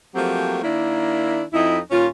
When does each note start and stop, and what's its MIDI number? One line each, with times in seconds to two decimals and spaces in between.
0.15 0.60 53
0.15 0.60 54
0.15 0.60 57
0.15 0.60 58
0.15 0.60 60
0.15 0.60 67
0.63 1.42 51
0.63 1.42 58
0.63 1.42 62
0.63 1.42 64
1.53 1.79 41
1.53 1.79 63
1.53 1.79 64
1.91 2.06 39
1.91 2.06 46
1.91 2.06 61
1.91 2.06 65